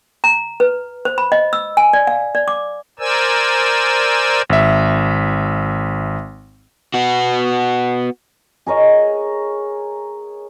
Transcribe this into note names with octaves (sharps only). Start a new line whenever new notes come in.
A#5
B4
C5
B5
D#5
E6
G#5
D5
F5
D5
D6
A#4 C5 D5 G#5 E6
G#1 E5
B3 F#4
G#4 A#4 C#5 D#5